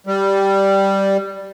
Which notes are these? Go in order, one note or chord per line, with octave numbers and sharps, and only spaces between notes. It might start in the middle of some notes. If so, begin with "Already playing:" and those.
G3